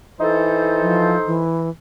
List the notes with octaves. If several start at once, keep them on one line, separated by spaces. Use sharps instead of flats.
E3 D#4 A4 C5
F3
E3